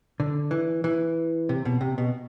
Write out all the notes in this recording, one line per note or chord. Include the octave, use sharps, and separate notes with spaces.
D3
E3
E3
C3
B2
C3
B2